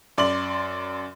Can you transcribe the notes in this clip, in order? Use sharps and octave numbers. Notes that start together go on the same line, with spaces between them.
F#2 D5 C6 F#7